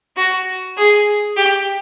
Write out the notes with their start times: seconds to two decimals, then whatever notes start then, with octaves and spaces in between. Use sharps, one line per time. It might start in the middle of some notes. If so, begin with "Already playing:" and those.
0.17 F#4
0.77 G#4
1.37 G4